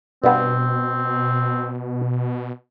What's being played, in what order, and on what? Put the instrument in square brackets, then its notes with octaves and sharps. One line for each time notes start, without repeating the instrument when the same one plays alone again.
[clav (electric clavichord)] G2 B3 [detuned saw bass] B2 [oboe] C4